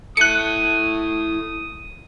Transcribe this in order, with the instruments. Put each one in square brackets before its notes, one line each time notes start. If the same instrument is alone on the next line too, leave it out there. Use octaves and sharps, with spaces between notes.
[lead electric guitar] E4 A4 [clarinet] D#6 [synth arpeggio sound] F#6 C#7